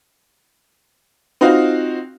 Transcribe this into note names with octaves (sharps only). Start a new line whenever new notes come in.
C4 D#4 F4 F#4 F5